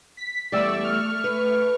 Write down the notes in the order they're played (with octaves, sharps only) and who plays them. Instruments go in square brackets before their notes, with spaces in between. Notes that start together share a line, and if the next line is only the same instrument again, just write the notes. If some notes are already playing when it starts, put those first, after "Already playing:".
[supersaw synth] B6
[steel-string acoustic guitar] E2 G3 [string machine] A3 C#6 [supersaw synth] D5 E6
[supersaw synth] F6
[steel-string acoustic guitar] B4